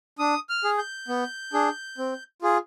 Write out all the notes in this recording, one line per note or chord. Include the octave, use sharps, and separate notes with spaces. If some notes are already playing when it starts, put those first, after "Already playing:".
D4 D#6
F6
G#4
G6
B3
D4 G#4
C4
F4 G#4